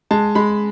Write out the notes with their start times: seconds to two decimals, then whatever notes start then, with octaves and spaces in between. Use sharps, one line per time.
0.11 G#3 A5
0.35 G#3 B5